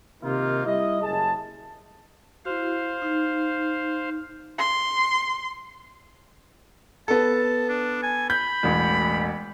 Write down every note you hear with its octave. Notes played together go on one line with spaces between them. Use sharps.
C3 D#3 A#3 D#4 F4
G3 E4 D#5
F#1 G#4 A5
E4 F#4 C5 F5
D#4
C6
B3 A4 A5
D4
G#5
B5 G6
E1 A1